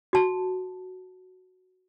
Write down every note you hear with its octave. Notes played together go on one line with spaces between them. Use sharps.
F#4 A5